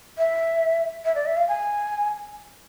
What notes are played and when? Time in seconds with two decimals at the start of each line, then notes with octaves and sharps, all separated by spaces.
0.18 E5
1.05 E5
1.15 D5
1.26 E5
1.37 F5
1.48 G#5